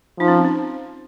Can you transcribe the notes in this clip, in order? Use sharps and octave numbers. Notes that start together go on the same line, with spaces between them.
F3 D#4
C#4
C4
C#4